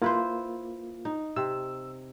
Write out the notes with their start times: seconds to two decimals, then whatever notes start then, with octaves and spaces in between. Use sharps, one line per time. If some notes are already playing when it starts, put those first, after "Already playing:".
0.02 A#3 E4 F4 B4 C5
1.05 D#4
1.36 C3 E6